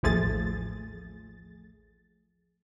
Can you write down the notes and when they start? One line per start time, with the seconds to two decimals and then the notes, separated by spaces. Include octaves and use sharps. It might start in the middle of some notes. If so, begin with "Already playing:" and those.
0.03 A1 D#2 F3 A3 G#4 A6